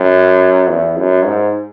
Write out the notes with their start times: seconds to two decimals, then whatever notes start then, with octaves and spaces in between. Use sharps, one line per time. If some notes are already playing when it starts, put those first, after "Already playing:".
Already playing: F#2
0.70 E2
0.98 F#2
1.26 G#2